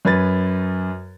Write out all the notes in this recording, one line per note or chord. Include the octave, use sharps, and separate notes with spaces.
F#2 B4 G#6 A6